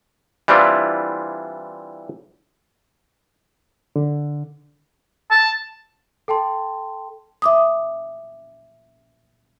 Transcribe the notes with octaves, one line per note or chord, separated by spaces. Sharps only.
E3 G3 C4 D4 E4 F4
D3
A5
A4 G5 A5 C6
E5 D6 D#6